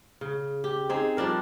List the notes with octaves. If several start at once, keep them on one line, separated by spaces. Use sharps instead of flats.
C#3
G4
C4 D#4 G#4
F3 G3 D4 A#4